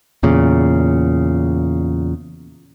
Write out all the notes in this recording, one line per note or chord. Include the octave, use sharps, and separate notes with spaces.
E2 A#2 C#3